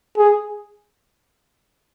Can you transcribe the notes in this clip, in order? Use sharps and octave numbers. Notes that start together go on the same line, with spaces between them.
G#4